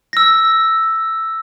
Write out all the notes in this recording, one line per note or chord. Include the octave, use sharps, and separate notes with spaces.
E6 A#6